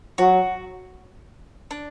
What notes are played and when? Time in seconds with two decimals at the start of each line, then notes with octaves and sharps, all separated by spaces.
0.18 F#3 F#4
1.71 D4